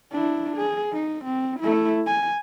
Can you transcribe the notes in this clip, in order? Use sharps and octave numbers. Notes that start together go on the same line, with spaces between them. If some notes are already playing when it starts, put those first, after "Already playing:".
D4 E4
G#4
D#4
C4
A3 E4
G#5